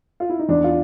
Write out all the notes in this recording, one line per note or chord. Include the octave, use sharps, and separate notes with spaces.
F4
E4
D#4
E2 D4
F4